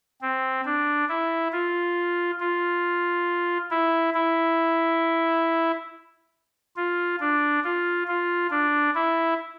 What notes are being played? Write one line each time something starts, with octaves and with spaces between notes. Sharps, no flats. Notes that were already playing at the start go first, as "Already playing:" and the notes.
C4
D4
E4
F4
F4
E4
E4
F4
D4
F4
F4
D4
E4